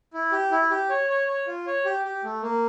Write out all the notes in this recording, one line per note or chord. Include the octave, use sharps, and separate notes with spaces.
E4
G4
E4
G4
C#5
C#5
C#5
F4
C#5
G4
G4
A3
A#3